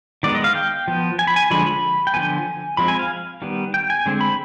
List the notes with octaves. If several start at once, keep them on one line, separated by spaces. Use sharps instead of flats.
D#3 G#3 B3 D5
D#5
F5
G5
F3 B3
G#5
B5
G#5
D3 F3 G#3 B5
B5
G5
D3 F3 B3 G#5
F3 G#3 C4 B5
G#5
F5
D#3 G3 B3
G5
G#5
D3 G#3 C4
B5